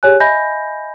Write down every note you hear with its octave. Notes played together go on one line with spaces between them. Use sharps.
G4 G#4 C#5 G#5 F#6
D#5 E5 G#5 B5 G6 A#6